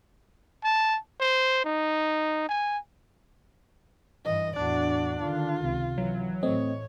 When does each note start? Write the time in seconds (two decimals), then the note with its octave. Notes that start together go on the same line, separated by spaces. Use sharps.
0.64 A5
1.20 C5
1.65 D#4
2.49 G#5
4.25 G2 E3 D#5
4.56 E2 A2 D4 F#4 D5
5.22 D3 D#3 F4
5.64 C#2 C3
5.98 E3 F#3
6.43 A2 A3 C4 C#5 D#5